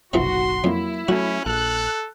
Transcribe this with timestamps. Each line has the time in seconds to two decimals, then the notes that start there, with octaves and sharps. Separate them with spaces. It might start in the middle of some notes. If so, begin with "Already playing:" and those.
0.13 F#1 B1 C3 E3 F3 F#4 C6
0.64 F2 F#3 A#3 E4
1.08 F#3 A3 C#4 F#4
1.46 A#1 A4 F#6